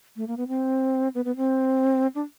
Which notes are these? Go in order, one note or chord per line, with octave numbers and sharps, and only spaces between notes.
A3
A#3
B3
C4
B3
B3
C4
D4